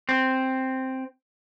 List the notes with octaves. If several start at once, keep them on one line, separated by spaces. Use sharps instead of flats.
C4